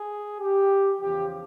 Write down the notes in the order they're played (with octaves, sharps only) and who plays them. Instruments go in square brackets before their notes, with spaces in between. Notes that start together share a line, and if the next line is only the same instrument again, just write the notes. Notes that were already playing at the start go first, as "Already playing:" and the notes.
Already playing: [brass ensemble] G#4
G4
E2 C#3 F3 G4